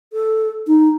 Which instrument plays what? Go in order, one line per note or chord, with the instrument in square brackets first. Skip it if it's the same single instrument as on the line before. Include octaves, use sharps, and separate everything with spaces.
[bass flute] A4
D#4